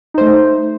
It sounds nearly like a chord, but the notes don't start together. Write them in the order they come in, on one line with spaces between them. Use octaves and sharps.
D#4 C5 A3